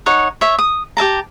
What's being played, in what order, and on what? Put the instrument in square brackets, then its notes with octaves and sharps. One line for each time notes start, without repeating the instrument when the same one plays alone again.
[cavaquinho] D#4 C#5 F#5
C#5 E5
D#6
G4 E5 A5 A#5